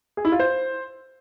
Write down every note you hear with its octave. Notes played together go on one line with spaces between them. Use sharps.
G#4
E4
F4
C5